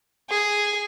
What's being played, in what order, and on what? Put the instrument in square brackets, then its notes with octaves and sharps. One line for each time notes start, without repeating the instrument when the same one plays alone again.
[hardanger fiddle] G#4